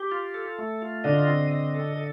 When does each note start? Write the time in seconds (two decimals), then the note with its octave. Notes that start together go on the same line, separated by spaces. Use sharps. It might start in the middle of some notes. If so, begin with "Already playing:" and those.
Already playing: G4
0.12 F4
0.34 A4
0.59 A3
0.82 F4
1.04 D3 D4 D#5
1.27 C4
1.51 D#5
1.74 A4
1.97 A4